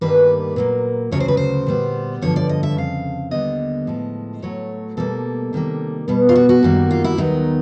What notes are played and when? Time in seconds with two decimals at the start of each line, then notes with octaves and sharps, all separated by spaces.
0.01 G2 D#3 G3 A#3 B4
0.56 A#2 F#3 A#3
1.11 D2 C#3 F#3 C#5
1.20 C5
1.28 B4
1.37 C5
1.67 A#2 G3 B3
2.22 G2 D3 F3 C#5
2.36 D5
2.49 D#5
2.63 E5
2.77 F2 C#3 F5
3.31 D#2 D3 G3 B3 D#5
3.87 A2 F3 G#3
4.42 A2 F#3 A3 C#5
4.97 B2 G3 A#3 A4
5.53 C3 D#3 G3 A#3
6.08 B2 G3 B3
6.29 F4
6.36 F#4
6.49 F#4
6.63 F#2 D#3 G3 A#3
6.91 F4
7.04 E4
7.18 D#2 D#3 F#3 B3 D#4